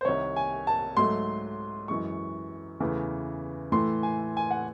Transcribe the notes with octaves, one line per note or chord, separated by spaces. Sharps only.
C5
C2 C3 D#3 C#5
G#5
A5
G#2 F#3 A3 C6
F#2 E3 G#3 C#6
E2 C#3 E3 A3
A2 E3 A3 C6
G#5
G#5
F#5